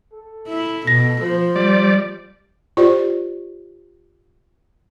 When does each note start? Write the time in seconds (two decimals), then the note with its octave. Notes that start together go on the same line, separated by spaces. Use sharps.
0.14 A4
0.48 E4
0.87 B2 A#6
1.22 F3 C5
1.56 G3 D5
2.77 F4 G4 C5 D5